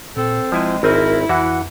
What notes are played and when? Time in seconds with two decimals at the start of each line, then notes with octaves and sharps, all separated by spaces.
0.16 A#2 C4 A4
0.52 E1 F3 G#3 E4 G#5
0.83 D#1 G#1 C4 E4 A#4 G#5
1.29 F2 E3 F#4 F#5